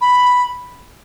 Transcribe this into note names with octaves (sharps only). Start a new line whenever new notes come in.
B5